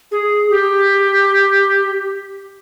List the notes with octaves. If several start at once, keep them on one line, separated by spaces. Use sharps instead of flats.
G#4
G4